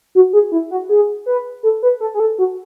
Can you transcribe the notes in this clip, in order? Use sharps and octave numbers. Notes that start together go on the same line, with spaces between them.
F#4
G#4
E4
F#4
G#4
B4
A4
B4
A4
G#4
A4
F#4